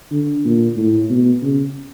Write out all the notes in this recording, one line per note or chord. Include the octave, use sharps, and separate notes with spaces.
D3
A#2
A2
B2
C#3